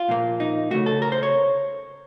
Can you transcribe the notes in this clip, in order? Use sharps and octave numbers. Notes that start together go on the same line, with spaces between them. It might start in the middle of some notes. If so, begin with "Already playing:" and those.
Already playing: F4
A#2 F3 A#3
D#4
C#3 A3 F#4
A4
A#4
C5
C#5